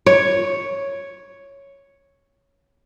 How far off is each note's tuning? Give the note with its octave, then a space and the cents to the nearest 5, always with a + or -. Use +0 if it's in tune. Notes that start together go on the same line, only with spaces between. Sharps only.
C#5 +0